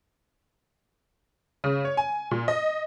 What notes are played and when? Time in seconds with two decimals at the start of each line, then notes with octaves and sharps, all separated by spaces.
1.64 C#3
1.85 C#5
1.97 G#5
2.31 A#2
2.48 D#5